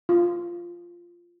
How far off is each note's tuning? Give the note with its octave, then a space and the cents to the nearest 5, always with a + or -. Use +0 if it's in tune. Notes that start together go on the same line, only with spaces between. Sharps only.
F4 -5